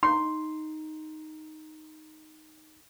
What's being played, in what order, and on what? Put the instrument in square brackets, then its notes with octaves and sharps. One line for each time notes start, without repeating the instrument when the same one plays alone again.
[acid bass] D#4 [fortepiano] C6